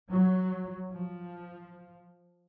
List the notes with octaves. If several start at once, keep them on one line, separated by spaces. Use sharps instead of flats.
F#3
F3